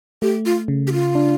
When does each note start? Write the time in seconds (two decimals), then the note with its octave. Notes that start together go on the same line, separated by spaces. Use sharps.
0.22 A3 G4
0.46 F4
0.68 C#3
0.87 G4
0.93 F4
1.15 D4